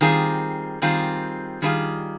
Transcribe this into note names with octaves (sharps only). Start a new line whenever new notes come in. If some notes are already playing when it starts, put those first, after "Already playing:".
D#3 G3 C4 F4 G#4
D#3 G3 C4 F4 G#4
D#3 G3 C4 F4 G#4